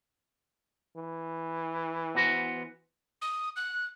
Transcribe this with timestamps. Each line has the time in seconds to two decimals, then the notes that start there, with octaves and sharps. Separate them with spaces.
0.97 E3
2.15 B3 F#4 C5
3.22 D#6
3.56 F#6